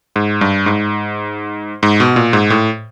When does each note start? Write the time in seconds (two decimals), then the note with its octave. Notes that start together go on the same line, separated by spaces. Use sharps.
0.16 G#2
0.41 G2
0.66 G#2
1.83 G#2
2.00 B2
2.16 A#2
2.33 G#2
2.50 A2